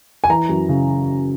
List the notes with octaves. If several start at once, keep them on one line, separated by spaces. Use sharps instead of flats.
G#5
E3 A#5
F#2
C#3